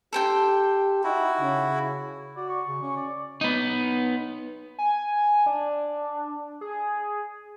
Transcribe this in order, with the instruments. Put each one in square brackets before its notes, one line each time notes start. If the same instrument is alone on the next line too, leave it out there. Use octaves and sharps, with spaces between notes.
[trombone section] G4 [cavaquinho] A4 C5 G5
[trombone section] D#4 [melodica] E4 F#4
[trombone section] C#3
[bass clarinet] F#4 [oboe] D5
[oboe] C#6
[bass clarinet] C#3
C#4
[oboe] D5
[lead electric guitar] B3 D#4
[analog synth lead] G#5
D4
G#4